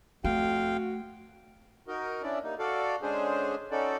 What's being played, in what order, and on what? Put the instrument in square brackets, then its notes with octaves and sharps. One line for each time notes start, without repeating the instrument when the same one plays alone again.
[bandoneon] F2 F5 G5 [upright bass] A3 [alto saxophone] F#4
[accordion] D#4 F#4 A#4 D#5
C#4 D4 E4 D5
G3 A#3 D#4
F#4 A4 D5 F5
D3 G#3 C#4 D4 G#4 C5
C#4 D#4 F#4 A4 D5